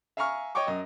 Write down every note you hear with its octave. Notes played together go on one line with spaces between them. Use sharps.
E5 F5 G#5 A#5 C#6 F6
C#5 D#5 G5 C#6 D6
F#2 D#5